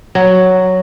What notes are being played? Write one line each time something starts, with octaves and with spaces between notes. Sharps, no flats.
F#3